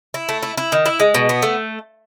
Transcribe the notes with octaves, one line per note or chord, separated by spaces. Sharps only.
E4
A3
E4
E4
D#3
E4
G#3
B2
B3
A3